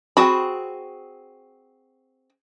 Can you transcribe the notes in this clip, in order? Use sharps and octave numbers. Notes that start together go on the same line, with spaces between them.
C4 F#4 G#4 B5